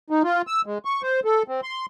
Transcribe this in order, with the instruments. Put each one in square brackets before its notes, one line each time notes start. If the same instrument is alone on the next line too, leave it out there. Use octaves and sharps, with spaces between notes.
[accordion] D#4
F4
E6
G#3
C#6
C5
A4
C4
C6